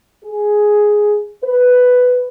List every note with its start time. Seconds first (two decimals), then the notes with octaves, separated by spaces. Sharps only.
0.23 G#4
1.42 B4